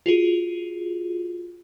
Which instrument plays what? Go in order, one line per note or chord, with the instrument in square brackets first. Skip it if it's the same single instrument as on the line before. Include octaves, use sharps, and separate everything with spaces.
[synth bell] F4 F#4 G#4